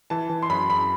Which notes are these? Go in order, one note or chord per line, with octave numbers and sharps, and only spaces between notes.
E3 A5
E3
C6
F#2 B5
F#2 B5